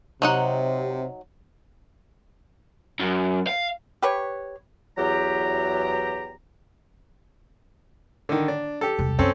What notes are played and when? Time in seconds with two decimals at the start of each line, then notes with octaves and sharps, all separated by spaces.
0.22 C3 F#3 D#4 F#5
3.00 F#2
3.47 F5
4.02 G4 B4 C#5
4.98 E2 F#3 G4 A#5
8.29 D3 D#3
8.48 D4
8.81 G4 A4
8.99 E1 C2
9.19 F#2 C4 C#4 A4